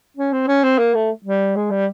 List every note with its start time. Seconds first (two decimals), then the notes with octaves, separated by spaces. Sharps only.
0.17 C#4
0.32 C4
0.47 C#4
0.63 C4
0.78 A#3
0.94 A3
1.24 G3
1.56 G#3
1.71 G3